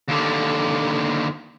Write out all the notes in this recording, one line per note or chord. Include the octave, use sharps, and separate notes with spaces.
D#2 D3